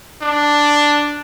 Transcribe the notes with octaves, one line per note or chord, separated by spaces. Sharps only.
D4